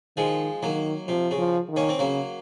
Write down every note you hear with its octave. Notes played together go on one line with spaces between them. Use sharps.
D#3 F3 G#3
D#3 F#3 A#3
C3 F3
C#3
F3
D#3
A#3 C#4
C4
C#3 F#3 A#3